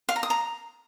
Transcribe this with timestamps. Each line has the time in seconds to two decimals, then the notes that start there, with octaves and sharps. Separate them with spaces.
0.09 F5
0.16 A#5
0.23 D#6
0.30 A#5